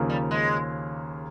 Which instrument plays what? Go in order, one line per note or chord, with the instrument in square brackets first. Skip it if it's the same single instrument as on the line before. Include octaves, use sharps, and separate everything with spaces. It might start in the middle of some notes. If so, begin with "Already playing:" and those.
Already playing: [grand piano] D#2 C#3 F3 A#3 C#4
[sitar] G3
G#3